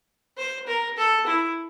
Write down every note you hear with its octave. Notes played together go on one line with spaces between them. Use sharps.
C5
A#4
A4
E4